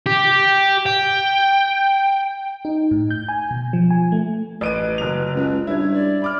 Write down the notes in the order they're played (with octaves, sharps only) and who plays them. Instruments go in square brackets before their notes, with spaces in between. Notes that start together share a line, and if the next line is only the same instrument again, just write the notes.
[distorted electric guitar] G4
G5
[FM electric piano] D#4
A2
G6
G#5
B2
F3
G#5
A3
[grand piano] A1 D7 D#7 [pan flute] B4
[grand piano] F#1 F#3 F7
[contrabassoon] C#2
[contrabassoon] G2 [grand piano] E4 G#6 [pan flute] C#5
[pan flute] D5
[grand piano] B5 D6 F6